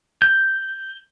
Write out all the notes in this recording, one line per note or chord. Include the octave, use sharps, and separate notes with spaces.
G6